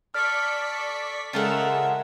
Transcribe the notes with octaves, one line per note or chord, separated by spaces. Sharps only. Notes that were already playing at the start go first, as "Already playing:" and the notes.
A4 D5 C#6 F6 B6
C#3 G#3 F4 A4 A#4 E5 F#5